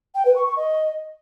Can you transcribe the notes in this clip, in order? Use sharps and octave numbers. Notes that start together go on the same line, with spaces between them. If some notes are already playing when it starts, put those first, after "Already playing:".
G5
B4
C#6
C#6
D#5